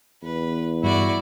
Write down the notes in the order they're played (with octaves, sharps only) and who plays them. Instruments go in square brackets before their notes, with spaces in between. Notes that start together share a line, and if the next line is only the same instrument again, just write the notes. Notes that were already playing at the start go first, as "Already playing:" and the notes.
[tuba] E2 [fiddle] B4
[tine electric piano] G2 G3 [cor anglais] E4 [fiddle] F#4 D5